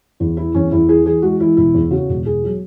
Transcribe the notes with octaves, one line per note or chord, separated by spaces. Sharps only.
E2 E4
E3 E4
E2 C#4
E2 E4
E3 G#4
E3 G#4
G#3 F#4
E3 E4
E1 E4
E2
C#3 F#4
E1
E1 G#4
F#3